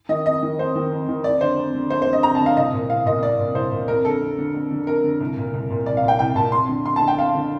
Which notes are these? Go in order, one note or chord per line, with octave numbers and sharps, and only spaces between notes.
D#3 D#5
F2 D#5
D#3
F2 C5
D#3
F2
D#3
F2 D5
D3 C5
F2
D3
F2 C5
C5
D3
D#5
F2 A#5
A5
D3
F5
C2 D#5
A#2
C2 F5
A#2 D#5
C2 D5
A#2
C2 C5
A#2
F2 A#4
D3 A4
F2
D3
F2
D3
F2 A#4
D3
C2
A#2
C2
A#2
C2 D5
F5
A#2
G5
C2 G5
A#2 A5
F2 C6
D3
F2 C6
A5
D3
G5
F2 F5
D3